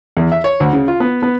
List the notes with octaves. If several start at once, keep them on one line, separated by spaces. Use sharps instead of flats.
E2
E5
C#5
D2
C#3
F4
B3
B3